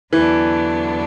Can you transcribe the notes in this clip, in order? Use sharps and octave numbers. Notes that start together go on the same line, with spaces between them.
E2 D3 E3 F#3 B3 D4